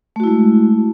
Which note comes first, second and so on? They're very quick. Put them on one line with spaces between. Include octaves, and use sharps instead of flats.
A3 F#4 E4 G#3